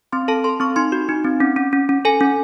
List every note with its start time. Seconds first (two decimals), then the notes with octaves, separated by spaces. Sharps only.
0.12 C4 C6
0.28 A4 A5
0.44 A4 C6
0.60 C4 C#6
0.76 D#4 C6
0.92 F#4
1.09 D#4
1.24 C4
1.40 C#4
1.56 C#4
1.73 C#4
1.89 C#4
2.05 A4 G#5
2.21 C#4